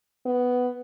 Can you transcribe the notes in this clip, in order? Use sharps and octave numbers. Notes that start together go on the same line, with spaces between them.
B3